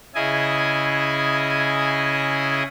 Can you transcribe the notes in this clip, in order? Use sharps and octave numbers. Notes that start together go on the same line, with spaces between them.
C#3 E4 G#4 D#5 G#5